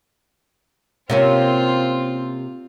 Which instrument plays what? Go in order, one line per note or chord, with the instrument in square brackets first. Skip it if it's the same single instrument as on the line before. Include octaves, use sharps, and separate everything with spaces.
[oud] C3 A#3 C#4 [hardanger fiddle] C4 F4